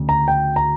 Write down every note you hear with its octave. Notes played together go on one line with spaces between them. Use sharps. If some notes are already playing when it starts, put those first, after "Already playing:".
Already playing: D2 C#3
A#5
G5
A#5